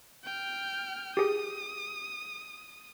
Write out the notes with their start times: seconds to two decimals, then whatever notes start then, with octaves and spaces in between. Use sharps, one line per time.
0.24 G5 F6
1.17 G4 G#4 D#6